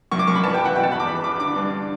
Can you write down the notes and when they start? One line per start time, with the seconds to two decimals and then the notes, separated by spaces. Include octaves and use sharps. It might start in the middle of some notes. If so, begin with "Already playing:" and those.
0.11 F#2 C#6
0.19 D6
0.27 F#2 C#6
0.36 B5
0.43 E3 A5
0.54 G5
0.60 E3
0.65 F#5
0.75 B2 G5
0.83 A5
0.92 E2 B5
1.00 D6
1.08 E3 B5
1.24 E3 D6
1.40 D3 D6
1.56 G2